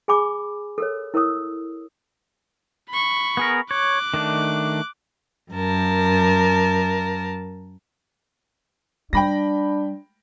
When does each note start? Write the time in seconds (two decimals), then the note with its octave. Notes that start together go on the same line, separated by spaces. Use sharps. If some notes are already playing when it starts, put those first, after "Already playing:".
0.08 G#4 G#5 B5 D6
0.78 A4 A#4 C#5
1.14 E4 A#4 C#5 D#6 E6
2.90 B5 C#6
3.37 B3 G#4 A#4
3.71 C#5 D6 F#6
4.14 D#3 A3 D4
5.52 F#2 A#4 A5
9.13 G3 D4 G5 B5 A#6